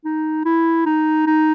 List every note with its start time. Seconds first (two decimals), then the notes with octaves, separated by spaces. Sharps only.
0.05 D#4
0.45 E4
0.86 D#4
1.27 D#4